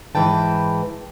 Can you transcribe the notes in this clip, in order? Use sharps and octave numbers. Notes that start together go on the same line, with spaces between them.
G#2 E3 B4 G5 A5